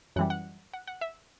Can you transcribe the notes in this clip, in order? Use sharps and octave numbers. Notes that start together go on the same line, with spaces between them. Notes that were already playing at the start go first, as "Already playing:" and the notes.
F#2 E3 G3 F#5
F#5
F#5
F#5
E5